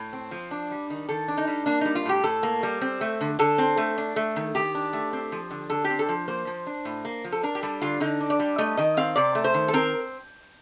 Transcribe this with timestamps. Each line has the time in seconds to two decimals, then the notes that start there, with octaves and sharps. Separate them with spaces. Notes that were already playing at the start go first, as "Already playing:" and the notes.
Already playing: A2
0.13 C4
0.31 F3
0.51 D4
0.71 G3
0.90 D#3
1.09 D#3 A4
1.28 D4
1.37 D#4
1.47 G3
1.66 A#3 D4
1.81 G3 D#4
1.95 F4
2.06 A2 G4
2.24 A2 A4
2.43 A#3
2.63 G3
2.81 C4
3.01 A3
3.21 D3
3.39 D3 A4
3.58 C4
3.77 A3
3.98 D4
4.16 A3
4.36 D#3
4.55 D#3 G4
4.75 D4
4.93 A3
5.13 C4
5.32 F3
5.51 D3
5.70 D3 A4
5.84 G4
5.90 C4
5.99 A4
6.09 F3
6.28 A#3 C5
6.47 F3
6.67 D4
6.85 A2
7.05 A#3
7.25 F3
7.32 A4
7.43 D4 A#4
7.55 G4
7.62 G3 A4
7.82 D3 F4
8.00 D3 D#4
8.20 D4
8.30 D5
8.40 G3
8.58 A3 D#5
8.77 D#3 D#5
8.97 C4 F5
9.16 C3 D5
9.35 A3
9.44 C5
9.54 D#3
9.68 A4
9.73 C4 A#4